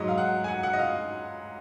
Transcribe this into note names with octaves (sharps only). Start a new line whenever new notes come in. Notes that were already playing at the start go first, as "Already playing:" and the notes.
Already playing: G#2 F#3 D#5
F5
F#5
G#5
F#5
F#5
D#5
F5